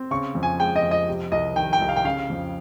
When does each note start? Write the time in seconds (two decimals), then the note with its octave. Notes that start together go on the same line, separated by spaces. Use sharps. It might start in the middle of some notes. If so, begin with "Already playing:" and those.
Already playing: C4
0.11 C#3 C#6
0.35 F2
0.43 G#5
0.59 G#3 G5
0.76 D#5
0.83 F2
0.91 D#5
1.08 C3
1.32 C2 D#5
1.56 D#3 G5
1.73 G5
1.82 C2
1.89 F5
1.96 G5
2.05 C#3 F5
2.30 F2